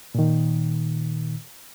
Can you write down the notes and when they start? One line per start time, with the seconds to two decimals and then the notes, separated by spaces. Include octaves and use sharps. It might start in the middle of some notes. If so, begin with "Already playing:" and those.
0.15 A#2 D#3